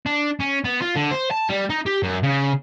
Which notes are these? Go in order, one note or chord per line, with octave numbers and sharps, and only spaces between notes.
D4
C#4
B3
F4
D3
C5
A5
G3
D#4
G4
F#2
C#3